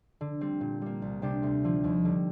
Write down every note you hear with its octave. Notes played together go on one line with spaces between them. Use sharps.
D3
G3 C4
A#2
G3 A#3
C2
C3 G3 D4 G4
D2
D3 F3
D#2
D3 G3